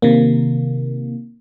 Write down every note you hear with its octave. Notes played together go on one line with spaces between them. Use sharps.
C3 D#3 A#3